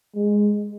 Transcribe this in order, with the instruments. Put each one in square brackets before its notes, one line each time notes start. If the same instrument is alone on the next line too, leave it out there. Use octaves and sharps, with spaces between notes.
[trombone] G#3